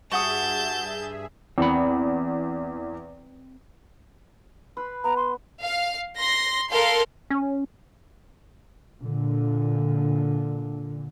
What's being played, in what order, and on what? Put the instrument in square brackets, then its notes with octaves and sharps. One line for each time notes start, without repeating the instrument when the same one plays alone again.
[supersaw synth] G2 G#4 E5 [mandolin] F#4 F#5 D#6 [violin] A5 G6
[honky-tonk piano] E2 [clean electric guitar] C4 B5
[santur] B4 B5 C6
[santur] B3 [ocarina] A#5
[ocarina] C6
[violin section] F5
C6 A#6
A4 A#4 F5 C6
[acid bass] C#4
[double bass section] A#2 D3